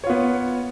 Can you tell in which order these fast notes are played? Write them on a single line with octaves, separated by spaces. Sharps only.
C#5 F4 B3